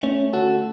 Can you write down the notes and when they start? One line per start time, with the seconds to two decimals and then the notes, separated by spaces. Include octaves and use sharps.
0.03 A3 C#4
0.33 D3 F#4 A4